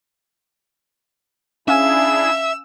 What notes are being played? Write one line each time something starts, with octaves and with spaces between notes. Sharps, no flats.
C#4 D4 E4 G#4 E5 F5 G#5 E6